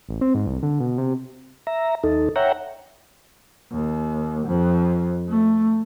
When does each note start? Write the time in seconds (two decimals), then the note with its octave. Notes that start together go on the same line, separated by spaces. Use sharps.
0.09 A1
0.21 C4
0.35 G#2
0.47 C2
0.63 D3
0.80 B2
0.98 C3
1.67 E5 A#5
2.03 D#2 D#4 A4
2.36 C#5 E5 F#5 G5 A#5
3.72 D#2
4.47 F2
5.29 A3